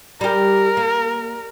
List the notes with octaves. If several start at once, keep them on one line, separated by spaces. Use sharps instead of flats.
G3 G4 A#4
A#3